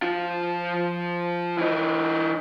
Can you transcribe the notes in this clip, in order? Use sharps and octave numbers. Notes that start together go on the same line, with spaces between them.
F3 F4
E3 D#4